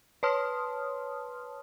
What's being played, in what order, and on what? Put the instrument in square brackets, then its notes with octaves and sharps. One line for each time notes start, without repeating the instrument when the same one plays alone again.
[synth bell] B4 C#5 A5 C6 D#6 F6